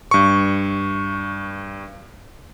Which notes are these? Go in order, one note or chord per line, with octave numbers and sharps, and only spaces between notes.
G2 C#6